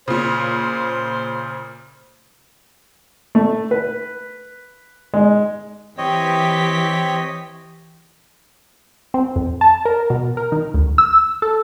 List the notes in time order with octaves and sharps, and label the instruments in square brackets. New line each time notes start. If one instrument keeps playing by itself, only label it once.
[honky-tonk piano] A#2 C#3 [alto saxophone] C5
[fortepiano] A3
B4
G#3
[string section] E3 G4 B6 [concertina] C4 C#5 D#5
[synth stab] C4
F2
A5
A#4
B2
A#4
D#3
D2
E6
A4